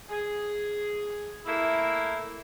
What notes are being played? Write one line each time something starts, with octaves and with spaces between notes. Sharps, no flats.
G#4
A3 A#3 E4